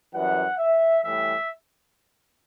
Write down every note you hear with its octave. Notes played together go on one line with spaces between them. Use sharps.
F#2 E3 G3 F#5
E5
A2 E3 G3 E5